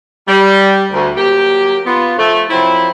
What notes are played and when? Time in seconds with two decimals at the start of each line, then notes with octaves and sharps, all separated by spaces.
0.28 G3
0.92 D2
1.16 F#3 A#3 G4
1.86 B3 F4
2.17 F3 A3
2.50 F3 F#3 C4 E4